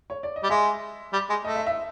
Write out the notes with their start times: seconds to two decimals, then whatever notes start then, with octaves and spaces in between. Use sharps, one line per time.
0.10 C#5
0.23 D5
0.36 D#5
0.43 G3
0.49 G#3 E5
1.13 G3
1.30 G#3
1.45 A3 D#5
1.56 E5
1.67 E5